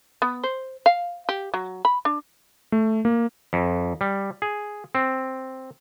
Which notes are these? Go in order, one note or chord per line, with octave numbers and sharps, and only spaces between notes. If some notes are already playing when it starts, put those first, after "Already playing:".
B3
C5
F5
G4
F#3
B5
D4
A3
A#3
F2
G3
G#4
C4